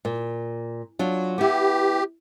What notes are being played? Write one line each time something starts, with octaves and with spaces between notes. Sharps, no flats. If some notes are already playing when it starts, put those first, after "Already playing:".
A#2
F#3 D4 F4
B3 E4 G4